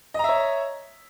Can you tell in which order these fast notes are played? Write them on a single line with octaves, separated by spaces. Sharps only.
D#5 A#5 E5 C#5